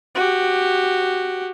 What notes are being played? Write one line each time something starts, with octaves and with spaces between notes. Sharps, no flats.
F#4 G4